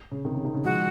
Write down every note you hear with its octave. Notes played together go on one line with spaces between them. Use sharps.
C#3
C3 D#3
C#3
C3 D#3
C#3
F3 G#3 F#4